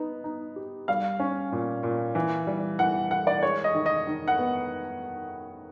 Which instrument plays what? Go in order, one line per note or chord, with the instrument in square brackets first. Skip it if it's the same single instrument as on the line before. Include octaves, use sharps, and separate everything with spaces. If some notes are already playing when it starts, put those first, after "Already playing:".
Already playing: [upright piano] B3 D#4
D#4
G4
[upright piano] G3 [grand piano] F5
[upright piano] C#4
A#2
A#2
E3
G3
[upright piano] E3 [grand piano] F#5
[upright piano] E3 [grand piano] F#5
[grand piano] D5
[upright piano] G#3 [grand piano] C#5
[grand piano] D#5
[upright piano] D#3
[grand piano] D#5
[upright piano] D#3
[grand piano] F#5
[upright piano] B3